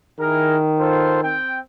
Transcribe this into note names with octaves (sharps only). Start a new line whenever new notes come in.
D#3 E4 G#4 A#4
F4 A4 C5
C4 G5